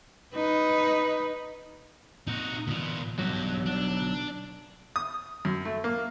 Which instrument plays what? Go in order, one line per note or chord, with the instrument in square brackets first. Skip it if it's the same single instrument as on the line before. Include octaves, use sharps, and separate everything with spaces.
[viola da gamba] D#4 B4
[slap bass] A#2 A#3 C4 [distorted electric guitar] D#4 F#4
[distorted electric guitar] A#2 B3 [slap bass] D3 E3
[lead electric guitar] B1 F#3 [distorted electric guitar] G2 G4
[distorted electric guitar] D4
[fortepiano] D#6
F#2
A3
A#3